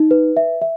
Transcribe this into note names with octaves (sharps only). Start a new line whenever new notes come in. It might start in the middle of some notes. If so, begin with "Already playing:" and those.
Already playing: D#4
B4
E5
E5